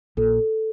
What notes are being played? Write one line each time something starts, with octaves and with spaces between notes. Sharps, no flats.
A#1 A#2 A4